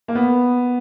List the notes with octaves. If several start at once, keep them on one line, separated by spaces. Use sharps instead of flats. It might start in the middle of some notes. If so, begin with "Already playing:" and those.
A#3
B3